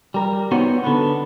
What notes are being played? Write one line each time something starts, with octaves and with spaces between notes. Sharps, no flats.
G3 A#4
B3 D#4 F#4 C5 C#5
D3 B3